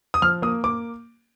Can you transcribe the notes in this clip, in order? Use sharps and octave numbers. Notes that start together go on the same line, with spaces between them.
D#6
F3 F6
A#3 D#6
A#3 D6